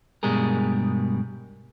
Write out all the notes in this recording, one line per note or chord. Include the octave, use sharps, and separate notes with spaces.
G2 B2 G3 G#3 G#4 A#4